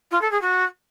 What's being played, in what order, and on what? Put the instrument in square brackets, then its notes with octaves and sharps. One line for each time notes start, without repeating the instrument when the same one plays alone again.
[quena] F4
A4
G#4
F#4